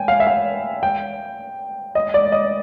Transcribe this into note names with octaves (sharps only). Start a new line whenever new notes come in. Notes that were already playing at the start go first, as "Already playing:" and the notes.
Already playing: G5 G#5
F5
E5
F5
G5
D#5
D5
D#5